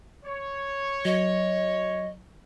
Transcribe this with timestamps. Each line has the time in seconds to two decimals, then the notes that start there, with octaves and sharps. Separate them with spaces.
0.25 C#5
1.05 F#3 D#5